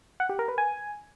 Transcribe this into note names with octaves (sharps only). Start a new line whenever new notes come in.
F#5
G4
A#4
B4
G#5